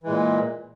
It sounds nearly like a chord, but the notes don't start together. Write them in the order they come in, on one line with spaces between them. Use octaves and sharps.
E3 G#3 A#2